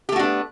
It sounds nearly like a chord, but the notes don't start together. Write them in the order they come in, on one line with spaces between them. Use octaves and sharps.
G4 A3 F#4 D4 B3